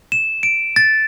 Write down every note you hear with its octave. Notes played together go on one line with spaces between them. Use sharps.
E7
D7
A6